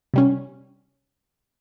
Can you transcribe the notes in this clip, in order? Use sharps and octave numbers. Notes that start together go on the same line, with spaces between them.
C3 G3 C#4